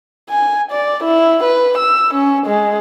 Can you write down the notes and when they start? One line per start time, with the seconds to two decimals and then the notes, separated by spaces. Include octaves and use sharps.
0.29 G#5
0.72 D5
1.04 E4
1.44 B4
1.78 E6
2.14 C#4
2.47 G#3